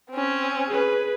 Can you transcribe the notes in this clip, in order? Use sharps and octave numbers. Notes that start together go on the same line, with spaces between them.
C4 C#4
G#4 B4